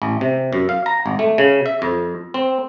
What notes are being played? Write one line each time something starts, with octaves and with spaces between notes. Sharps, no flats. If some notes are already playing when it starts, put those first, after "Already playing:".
A1
C3
F#2
F5
A#5
G#1
A3
C#3
E5
F2
C4